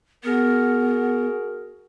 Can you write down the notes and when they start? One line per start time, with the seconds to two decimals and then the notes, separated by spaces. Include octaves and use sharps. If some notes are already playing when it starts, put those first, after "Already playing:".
0.24 B3 F#4 G#4 A#4